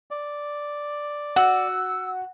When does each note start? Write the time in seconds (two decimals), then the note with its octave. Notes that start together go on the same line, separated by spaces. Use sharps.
0.11 D5
1.36 F#4 F#5 E6